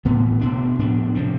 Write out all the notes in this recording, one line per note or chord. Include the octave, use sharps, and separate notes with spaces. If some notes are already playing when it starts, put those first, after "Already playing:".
A2 E3 B3
B2 B3 D4
A2 F3 B3 D4
C3 F3 C4